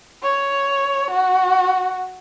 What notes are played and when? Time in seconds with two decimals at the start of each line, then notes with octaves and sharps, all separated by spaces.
0.23 C#5
1.10 F#4